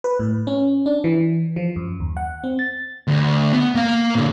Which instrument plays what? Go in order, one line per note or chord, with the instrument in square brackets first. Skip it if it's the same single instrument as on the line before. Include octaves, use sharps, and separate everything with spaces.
[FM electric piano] B4
A2
C#4
D4
E3
F3
F#2
D#2
F#5
C4
A6
[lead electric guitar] D2
B3
A#3 F5
A#2 D3